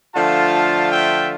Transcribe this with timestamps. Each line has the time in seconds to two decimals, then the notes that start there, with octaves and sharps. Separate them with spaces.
0.14 D3 F3 A3 D4 F4 F5 A5
0.91 E5 G5